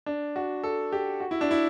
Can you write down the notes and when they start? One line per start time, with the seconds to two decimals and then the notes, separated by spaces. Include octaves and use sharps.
0.06 D4
0.36 F#4
0.63 A4
0.92 G4
1.20 F#4
1.31 E4
1.41 D4
1.51 E4